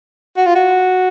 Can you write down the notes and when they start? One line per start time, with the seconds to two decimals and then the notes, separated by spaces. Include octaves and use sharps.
0.37 F#4
0.46 F4
0.55 F#4